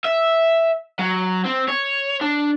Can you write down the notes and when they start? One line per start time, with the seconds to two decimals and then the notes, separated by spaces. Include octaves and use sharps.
0.04 E5
1.00 F#3
1.46 C4
1.69 C#5
2.21 D4